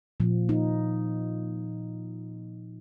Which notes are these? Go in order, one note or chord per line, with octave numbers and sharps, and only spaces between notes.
A#2 F3
D#4